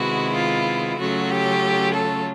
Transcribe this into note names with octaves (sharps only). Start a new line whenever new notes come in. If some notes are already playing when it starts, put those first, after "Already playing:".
Already playing: C3 D#3 G#3 B3 E4 F#4
F4
C#3 F#3 A3 C#4 F4 F#4
G4
A4